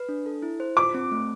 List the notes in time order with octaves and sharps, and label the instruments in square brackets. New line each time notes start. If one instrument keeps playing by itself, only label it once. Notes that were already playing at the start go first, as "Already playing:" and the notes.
Already playing: [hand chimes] B4
D4
A4
E4
C5
[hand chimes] F4 [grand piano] D6
[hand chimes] C4
A3